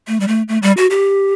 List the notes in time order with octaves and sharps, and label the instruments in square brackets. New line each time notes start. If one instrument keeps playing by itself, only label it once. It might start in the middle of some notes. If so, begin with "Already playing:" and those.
[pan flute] A3
G3
A3
A3
G3
F#4
G4